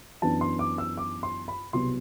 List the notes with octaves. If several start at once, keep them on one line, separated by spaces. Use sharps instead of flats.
F#2 E3 B3 D4 A5
C6
D6
E6
D6
C6
B5
C2 B2 F#3 B3 C6